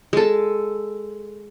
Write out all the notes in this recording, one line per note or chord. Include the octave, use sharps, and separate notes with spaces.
G#3 A4